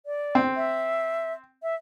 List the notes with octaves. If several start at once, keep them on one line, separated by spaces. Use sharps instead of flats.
D5
C4
E5
E5